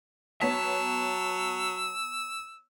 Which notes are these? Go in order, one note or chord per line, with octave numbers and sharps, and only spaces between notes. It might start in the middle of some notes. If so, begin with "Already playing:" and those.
F#3 B3 C#5 A5 E6 B6